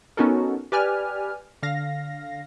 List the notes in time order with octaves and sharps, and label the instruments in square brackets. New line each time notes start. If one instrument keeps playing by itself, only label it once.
[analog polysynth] B3 C#4 D#4 F#4 A4 A#4
G4 B4 D5 G#5 F6
D3 F5 A#6